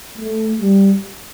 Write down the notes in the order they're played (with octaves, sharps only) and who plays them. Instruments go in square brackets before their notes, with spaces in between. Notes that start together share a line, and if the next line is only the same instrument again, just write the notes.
[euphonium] A3
G3